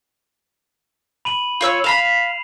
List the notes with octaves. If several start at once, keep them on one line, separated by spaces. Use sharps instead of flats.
B5 D#7 F#7
F4 C#5 E6
F5 A#5 B5 C7 E7 F7